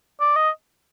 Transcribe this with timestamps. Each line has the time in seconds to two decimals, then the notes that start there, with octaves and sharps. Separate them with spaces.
0.20 D5
0.36 D#5